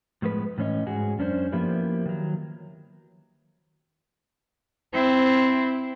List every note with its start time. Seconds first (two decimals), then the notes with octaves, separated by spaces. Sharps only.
0.22 A2 F3 G#3 B3 B4
0.58 A2 E3 C#4 C#5 D#5
0.87 G#2 F#4 G#4
1.19 F#2 C#4 D4 F#4 C5
1.52 F3 A#3 B3 E4 G4 B4
2.06 D#3 F#3
4.93 C4 E4